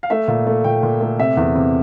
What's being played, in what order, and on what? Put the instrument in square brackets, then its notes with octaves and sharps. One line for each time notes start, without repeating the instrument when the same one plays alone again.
[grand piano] F5
A3 E5
A#2
A3
A#2 G5
A#2
A3
C3 E5
E2
C3